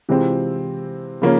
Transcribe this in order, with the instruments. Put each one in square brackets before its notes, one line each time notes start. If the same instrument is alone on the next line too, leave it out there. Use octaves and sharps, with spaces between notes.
[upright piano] C3 E3 G#3 C4 F4
C#3 F3 A#3 C#4